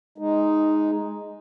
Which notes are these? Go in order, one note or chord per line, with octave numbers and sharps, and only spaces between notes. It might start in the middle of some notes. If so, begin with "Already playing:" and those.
G#3 D#4